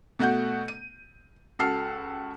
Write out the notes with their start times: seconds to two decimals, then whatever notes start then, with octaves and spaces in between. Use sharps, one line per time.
0.19 B2 A3 F#4 F#5 G6
0.68 D#7
1.59 C#2 F#4 A4 E6 F6 C7